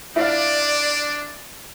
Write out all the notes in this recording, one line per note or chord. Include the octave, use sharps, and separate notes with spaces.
D4 E4 D5 F5